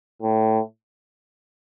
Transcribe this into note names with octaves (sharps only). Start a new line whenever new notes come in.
A2